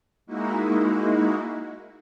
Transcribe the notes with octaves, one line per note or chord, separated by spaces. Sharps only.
G#3 A#3 D#4 E4 F#4